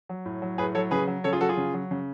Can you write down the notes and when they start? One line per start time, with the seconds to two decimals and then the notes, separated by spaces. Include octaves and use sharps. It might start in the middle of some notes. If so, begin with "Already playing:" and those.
0.09 F#3
0.26 A2
0.42 F#3
0.58 A2 G#4 B4
0.75 F#3 A4 C#5
0.91 C#3 G#4 B4
1.07 F#3
1.24 C#3 A4 C#5
1.33 F4 G#4
1.41 F#3 F#4 A4
1.49 F4 G#4
1.57 C#3
1.74 F#3
1.91 C#3